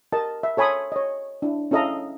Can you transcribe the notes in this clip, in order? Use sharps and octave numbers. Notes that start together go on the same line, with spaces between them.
G4 A#4 D#5 A5
E5
A4 C#5 G#5 B5 C6 D#6
C#5 D#5
D4 E4
C#4 E4 A4 D#5 F5 A#5